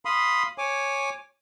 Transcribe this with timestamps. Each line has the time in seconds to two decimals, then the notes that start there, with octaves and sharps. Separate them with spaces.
0.05 F5 B5 C6 D#6
0.58 C#5 G#5 D6